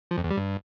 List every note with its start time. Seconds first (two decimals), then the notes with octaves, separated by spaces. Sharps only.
0.11 F3
0.17 F2
0.24 E2
0.31 G3
0.37 G2